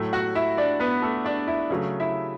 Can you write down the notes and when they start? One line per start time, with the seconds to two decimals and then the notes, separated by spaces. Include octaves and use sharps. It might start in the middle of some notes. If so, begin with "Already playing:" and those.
Already playing: A2 F#3 A3
0.13 F#4 F#5
0.35 E4 E5
0.57 D4 D5
0.80 B3 B4
1.02 A3 A4
1.25 D4 D5
1.47 E4 E5
1.70 C#3 F#3 A3
2.00 E4 E5